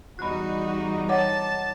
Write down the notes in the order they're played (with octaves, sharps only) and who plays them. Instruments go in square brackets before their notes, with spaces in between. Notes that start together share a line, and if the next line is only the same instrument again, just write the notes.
[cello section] E2 G3 D#4 [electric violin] F#4 [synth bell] B5 F#6
[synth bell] C#5 F#5 D6 [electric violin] A5